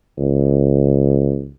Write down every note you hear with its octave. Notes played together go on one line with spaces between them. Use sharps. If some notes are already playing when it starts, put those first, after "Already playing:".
C#2